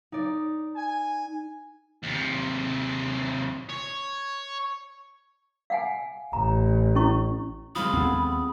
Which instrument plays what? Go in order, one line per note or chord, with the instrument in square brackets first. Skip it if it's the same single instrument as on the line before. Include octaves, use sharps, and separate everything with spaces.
[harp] D#4 D5
[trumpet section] G#5
[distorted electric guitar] D#2 C3
C#5
[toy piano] F5 F#5 G#5
[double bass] A1 [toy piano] A#5
[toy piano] C#4 E4 C#6
[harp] G#3 C4 F4 [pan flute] B5 [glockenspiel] D#6
[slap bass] D#2 B3 C#4 [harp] G#4 A4 F#5